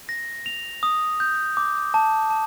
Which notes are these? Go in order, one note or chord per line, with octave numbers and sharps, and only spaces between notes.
A#6
F7
D#6
G6
D6
A5
A5